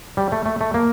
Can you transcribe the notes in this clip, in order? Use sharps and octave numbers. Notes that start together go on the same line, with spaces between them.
G3
A3
A3
A3
A#3